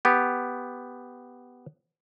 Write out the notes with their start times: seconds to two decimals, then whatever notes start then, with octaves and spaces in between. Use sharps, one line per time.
0.05 B3 G4